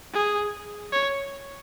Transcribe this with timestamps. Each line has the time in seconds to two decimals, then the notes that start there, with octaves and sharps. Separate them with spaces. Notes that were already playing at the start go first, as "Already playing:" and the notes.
0.14 G#4
0.93 C#5